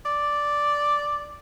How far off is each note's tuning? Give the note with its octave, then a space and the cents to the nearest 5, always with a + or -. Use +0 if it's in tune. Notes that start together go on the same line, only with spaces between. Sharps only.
D5 -5